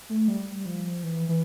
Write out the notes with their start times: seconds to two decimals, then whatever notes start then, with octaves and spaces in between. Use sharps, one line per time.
0.09 A3
0.28 G3
0.66 F3
1.03 E3
1.29 E3